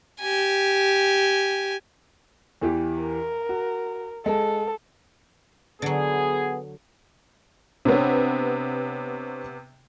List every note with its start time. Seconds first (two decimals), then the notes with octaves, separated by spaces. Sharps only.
0.20 G4 G#5
2.61 E2 E3 G4
3.00 A#4
3.49 F#4
4.26 G#3 A4
5.82 D3 F#3 B3 G#4
7.85 C3 B3 C4 D4 C#5